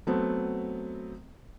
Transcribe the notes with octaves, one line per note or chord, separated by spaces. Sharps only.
F#3 A3 B3 C4